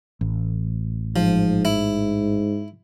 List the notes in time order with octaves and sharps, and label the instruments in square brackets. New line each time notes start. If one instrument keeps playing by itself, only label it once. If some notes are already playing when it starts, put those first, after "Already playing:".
[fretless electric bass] A1
[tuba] G#2 [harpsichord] F3
[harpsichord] E4